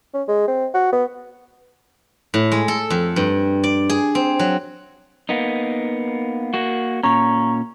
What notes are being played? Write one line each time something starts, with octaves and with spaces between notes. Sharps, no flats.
C#4
G#3
C4
F#4
B3
A2
G#3
A4
F2
G2
D5
G#4
C4
F#3
A#3 B3 D#4
A#3 F#4
A#2 C#4 A#5 C#6